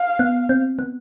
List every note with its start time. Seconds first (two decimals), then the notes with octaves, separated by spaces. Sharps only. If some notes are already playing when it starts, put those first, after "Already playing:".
Already playing: F5
0.19 B3
0.49 C4
0.79 B3